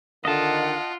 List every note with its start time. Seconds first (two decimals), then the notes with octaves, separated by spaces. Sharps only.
0.25 D3 D#3 F4 D#5 F#5 A5